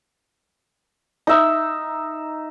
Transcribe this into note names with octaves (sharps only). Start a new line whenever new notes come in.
D#4 E5